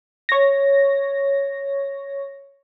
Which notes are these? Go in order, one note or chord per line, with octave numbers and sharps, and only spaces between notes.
C#5 A#6